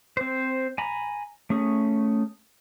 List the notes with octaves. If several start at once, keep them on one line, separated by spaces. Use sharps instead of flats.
C4 C5
G#5 A#5 B5
A3 C#4 G#4